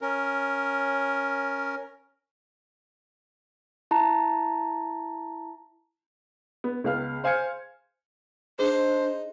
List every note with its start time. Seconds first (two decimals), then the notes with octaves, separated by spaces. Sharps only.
0.01 C#4 A#4
3.91 E4 A5 A#5
6.64 B3
6.84 C#2 B3 F5 F6
7.24 C5 F5 G#5 F6 G#6 C#7
8.59 D4 D#4 G#4 C5